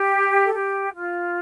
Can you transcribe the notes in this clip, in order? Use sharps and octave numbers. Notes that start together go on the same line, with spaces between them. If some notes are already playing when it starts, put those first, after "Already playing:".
Already playing: G4
A4
G4
F4